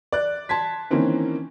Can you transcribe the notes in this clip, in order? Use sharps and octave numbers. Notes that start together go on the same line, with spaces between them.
D5 F#6
A5 C6 G#6 B6
D#3 E3 A#3 C4 C#4